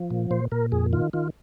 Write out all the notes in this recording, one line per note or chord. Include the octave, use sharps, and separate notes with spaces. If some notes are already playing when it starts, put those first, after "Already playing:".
Already playing: F3
A#2
A#2 C5
A#2 A#4
F2 G#4
D#3 F4
D#3 F4